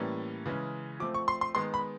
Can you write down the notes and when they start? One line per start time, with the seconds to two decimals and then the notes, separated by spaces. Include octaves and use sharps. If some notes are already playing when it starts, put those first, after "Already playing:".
Already playing: A2 E3 G3 A#3 C#4
0.46 C#3 E3 G#3 C#4
1.00 F3 A3 C4 D6
1.14 C#6
1.28 C6
1.41 C6
1.55 D#3 G#3 B3 C6
1.74 B5